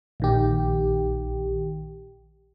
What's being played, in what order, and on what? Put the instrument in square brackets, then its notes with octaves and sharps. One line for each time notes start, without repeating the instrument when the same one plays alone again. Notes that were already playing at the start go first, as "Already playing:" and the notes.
[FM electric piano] A#1 D#3 G4